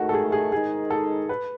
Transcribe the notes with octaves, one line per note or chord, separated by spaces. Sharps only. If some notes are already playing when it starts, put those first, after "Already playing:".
Already playing: G#2 D#3 A3 F#4
A4
G#4
G#4
G#2 D#3 G#3 D#4 G#4
A4
B4